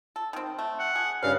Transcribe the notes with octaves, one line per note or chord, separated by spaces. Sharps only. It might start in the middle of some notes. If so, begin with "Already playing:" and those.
A4
D#3 C4
A3
F#5
G#4
G2 C#3 F#3 F5